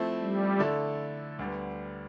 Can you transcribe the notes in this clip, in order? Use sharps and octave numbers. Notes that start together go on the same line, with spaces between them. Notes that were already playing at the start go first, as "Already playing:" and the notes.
Already playing: F3 A3 C4 E4
G3
D3 A3 E4 A4 D5
D2 D3 G3 B3